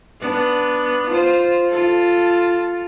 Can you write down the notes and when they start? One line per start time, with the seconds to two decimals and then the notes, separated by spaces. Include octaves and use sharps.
0.21 B3 D4
1.10 F4 C5
1.70 F4 A4